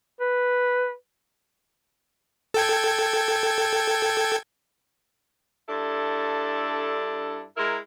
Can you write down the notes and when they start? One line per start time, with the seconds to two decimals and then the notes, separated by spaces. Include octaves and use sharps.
0.20 B4
2.54 A4 G5 G#6
5.69 G2 D4 E4 A4
7.57 G#3 E4 A#4